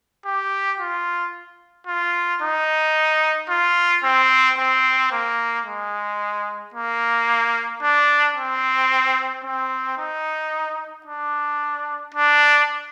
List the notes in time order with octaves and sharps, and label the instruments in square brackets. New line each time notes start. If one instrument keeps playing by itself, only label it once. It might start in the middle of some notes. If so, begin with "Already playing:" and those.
[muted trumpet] G4
F4
F4
D#4
F4
C4
C4
A#3
G#3
A#3
D4
C4
C4
D#4
D4
D4